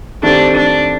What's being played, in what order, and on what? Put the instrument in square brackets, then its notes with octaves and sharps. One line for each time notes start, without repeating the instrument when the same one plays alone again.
[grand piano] D#3 A3 C4 G4 [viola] D4
[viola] D4